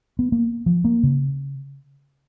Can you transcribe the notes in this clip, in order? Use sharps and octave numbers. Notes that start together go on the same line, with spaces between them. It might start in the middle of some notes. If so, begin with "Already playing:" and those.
B3
A#3
F3
A#3
C#3